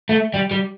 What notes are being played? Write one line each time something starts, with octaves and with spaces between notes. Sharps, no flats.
A3
G3
G3